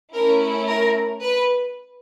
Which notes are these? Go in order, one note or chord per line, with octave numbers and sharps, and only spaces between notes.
A3 C#4 E4 A#4
A#4
B4